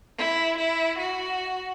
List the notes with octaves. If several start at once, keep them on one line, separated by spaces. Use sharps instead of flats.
E4
E4
F#4